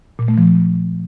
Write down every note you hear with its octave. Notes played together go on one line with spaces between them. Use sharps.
A#2
A3
F3